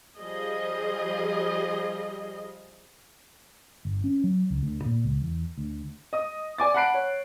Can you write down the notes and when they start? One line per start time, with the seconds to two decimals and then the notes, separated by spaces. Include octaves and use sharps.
0.18 F3 G3 G#4 D#5
3.85 G1
4.04 C#4
4.24 F#3
4.50 C#2
4.63 D2
4.85 A#2
5.04 C#2
5.22 E2
5.58 D2
6.13 D#5 D#6
6.58 D5 G#5 D6 A6
6.74 F#5 A5 B5 F#6 C7 D7
6.94 C#5